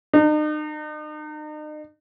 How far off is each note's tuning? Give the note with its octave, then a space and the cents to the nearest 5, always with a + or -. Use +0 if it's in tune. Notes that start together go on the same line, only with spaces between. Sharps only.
D#4 -40